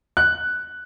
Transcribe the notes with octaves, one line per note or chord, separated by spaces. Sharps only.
F#6